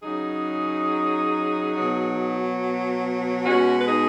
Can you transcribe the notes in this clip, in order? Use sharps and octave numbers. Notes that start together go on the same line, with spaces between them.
C#3 F#3 D#4 G#4
B2 F#3
B2 G#3 C#4 F#4
B4
D#4 G#4